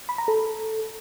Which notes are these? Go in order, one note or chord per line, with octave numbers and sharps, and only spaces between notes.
B5
A#5
A4